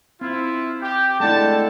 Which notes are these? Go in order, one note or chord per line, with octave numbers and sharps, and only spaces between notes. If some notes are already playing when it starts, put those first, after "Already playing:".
C4 E4 F4
G4 G5
D3 G#3 A3 E4 A5